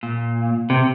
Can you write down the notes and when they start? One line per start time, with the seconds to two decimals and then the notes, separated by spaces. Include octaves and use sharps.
0.03 A#2
0.70 C3